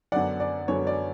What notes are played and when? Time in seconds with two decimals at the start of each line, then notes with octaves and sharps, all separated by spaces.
0.12 F#2 D3 F#3 B3 D5 F#5
0.40 D5
0.68 F#2 D3 F#3 B3 C#5
0.87 D5